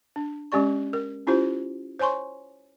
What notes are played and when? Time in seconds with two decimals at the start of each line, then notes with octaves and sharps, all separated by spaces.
0.16 D4
0.52 G#3 C#4 G4 D5 C#6
0.93 A#4
1.27 C#4 E4 F4 G4 C5
1.99 C5 C#5 G#5 C6 C#6